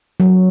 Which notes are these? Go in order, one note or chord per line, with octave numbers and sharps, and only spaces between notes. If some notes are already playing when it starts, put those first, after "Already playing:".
F#3